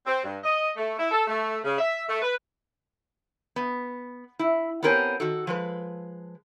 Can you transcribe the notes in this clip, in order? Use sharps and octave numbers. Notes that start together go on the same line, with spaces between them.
C4
G2
D#5
A3
E4
A4
A3
C#3
E5
A3
B4
B3
E4
B3 C4 G4 A#4 C#5 G#5
D#3 F#4 A4
F3 G#3 B4